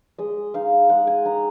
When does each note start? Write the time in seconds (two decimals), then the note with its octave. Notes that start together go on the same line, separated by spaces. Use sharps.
0.18 G#3 D#5
0.54 D#4 F5
0.89 G#3 F#5
1.07 G#5
1.26 D#4 A#5